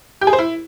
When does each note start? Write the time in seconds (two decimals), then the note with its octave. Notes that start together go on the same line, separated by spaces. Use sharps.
0.21 G4
0.27 G#4
0.33 C5
0.39 E4